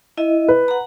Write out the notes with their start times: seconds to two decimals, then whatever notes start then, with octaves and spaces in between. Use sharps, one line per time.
0.17 E4 D#5 E5
0.48 B4
0.68 F#5 A#5